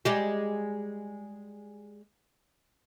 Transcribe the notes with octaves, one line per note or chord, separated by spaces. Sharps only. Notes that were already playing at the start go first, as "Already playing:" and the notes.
G3 G#3 G4